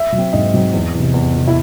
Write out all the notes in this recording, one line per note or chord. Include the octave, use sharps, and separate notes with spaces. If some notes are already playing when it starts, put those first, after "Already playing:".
Already playing: E5
F#3
C4
G#2 D#5
F#3 C4
E2
C3 E3
E2
C3 E3
E4